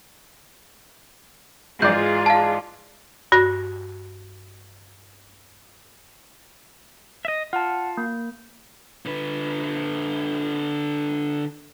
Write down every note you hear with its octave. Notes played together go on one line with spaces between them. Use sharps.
G#2 E3 F4 G#4 D5 G6
F5 A5
G2 F#4 A#6
D#5 E5
F4 F#5 A5
A#3
D3 B4